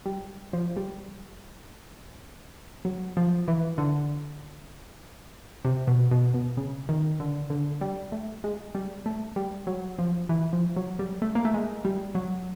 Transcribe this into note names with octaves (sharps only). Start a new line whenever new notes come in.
G3
F3
G3
F#3
F3
E3
D3
C3
B2
B2
B2
C#3
D#3
D3
D3
G3
A3
G#3
G3
A3
G3
F#3
F3
E3
F3
F#3
G3
A3
A#3
A3
G#3
G3
F#3